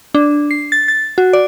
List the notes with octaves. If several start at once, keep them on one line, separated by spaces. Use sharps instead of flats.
D4
C7
A6
A6
F#4
D5